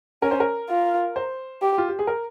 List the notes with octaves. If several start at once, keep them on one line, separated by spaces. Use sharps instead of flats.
C#4 A#4
C5
A#4
F4
C5
G4
F4
G4
G#4
A#4